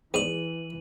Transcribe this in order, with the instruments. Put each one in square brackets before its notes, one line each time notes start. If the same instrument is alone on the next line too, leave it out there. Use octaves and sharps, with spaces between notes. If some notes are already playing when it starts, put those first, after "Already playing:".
[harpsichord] E2 G#2 D#5 [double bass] E3 [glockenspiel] D#7 F#7